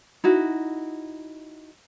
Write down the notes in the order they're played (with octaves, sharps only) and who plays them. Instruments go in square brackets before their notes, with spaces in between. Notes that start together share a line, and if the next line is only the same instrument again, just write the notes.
[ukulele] D#4 E4 F#4